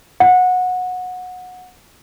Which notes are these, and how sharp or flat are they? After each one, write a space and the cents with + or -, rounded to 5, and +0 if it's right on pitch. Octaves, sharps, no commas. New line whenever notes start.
F#5 -20